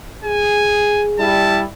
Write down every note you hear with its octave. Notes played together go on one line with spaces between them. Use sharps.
G#4 G#5
G3 E4 A5